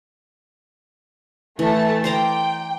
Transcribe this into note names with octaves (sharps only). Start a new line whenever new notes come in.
E3 A3 A5
C5 D5 G5 A#5